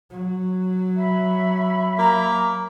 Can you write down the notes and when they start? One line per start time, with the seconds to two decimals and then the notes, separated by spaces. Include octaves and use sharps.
0.10 F#3
0.97 E5 B5
1.99 A#3 A#5